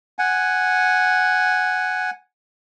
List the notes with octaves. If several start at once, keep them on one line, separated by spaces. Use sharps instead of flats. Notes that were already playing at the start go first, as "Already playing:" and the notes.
F#5 G#5